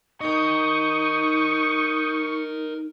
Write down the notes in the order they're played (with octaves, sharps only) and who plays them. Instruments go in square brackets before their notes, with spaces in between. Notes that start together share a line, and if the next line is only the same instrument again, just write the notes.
[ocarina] D#4 [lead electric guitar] A#4 D#5 [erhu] C#6 [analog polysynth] D#6 G6